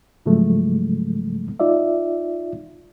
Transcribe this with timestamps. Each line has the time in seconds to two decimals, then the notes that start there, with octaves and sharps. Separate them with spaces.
0.26 G#2 C#3 F3 F#3 G#3 A3
1.60 D#4 F4 D5 E5